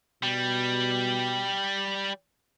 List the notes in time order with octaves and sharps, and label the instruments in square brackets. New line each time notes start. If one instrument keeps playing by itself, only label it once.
[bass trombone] B2 [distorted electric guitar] G3